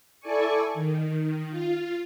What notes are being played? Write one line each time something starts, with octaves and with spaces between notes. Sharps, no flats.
E4 A4 D5 G#5 C#6
D#3
F4